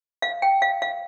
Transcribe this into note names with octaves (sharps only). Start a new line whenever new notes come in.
F5
G5
F5
F5